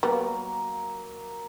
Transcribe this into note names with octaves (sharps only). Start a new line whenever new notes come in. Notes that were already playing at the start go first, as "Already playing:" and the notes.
F#3 G3 A#3 B3